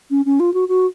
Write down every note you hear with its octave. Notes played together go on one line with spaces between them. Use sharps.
C#4
C#4
F4
F#4
F#4